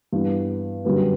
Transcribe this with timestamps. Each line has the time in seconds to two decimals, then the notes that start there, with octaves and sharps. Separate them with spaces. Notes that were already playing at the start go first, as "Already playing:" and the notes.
0.12 G2 E3 B3
0.84 F#2 D3 G3 B3 D4